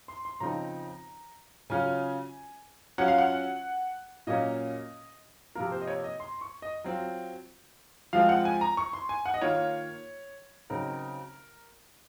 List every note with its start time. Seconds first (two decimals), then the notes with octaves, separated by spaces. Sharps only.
0.08 C6
0.25 C6
0.40 C#3 F3 C4 D#4 A#5
1.70 C#3 F#3 C#4 F4 G#5
2.98 F#3 C#4 F4 F#5
3.08 F5
3.18 F#5
4.27 A#2 F#3 A#3 C#4 D#5
5.55 C3 F3 A#3 F4 A#4
5.72 C5
5.82 D#5
5.87 C#5
6.04 D#5
6.20 C6
6.41 C#6
6.62 D#5
6.84 F#3 C4 F4
8.13 F3 G#3 C4 F4 F5
8.29 F#5
8.45 G#5
8.61 A#5
8.77 C#6
8.93 C6
9.09 G#5
9.26 F#5
9.34 D#5
9.42 D#3 A#3 F4 C#5
10.70 C#3 F#3 C4 D#4 A#4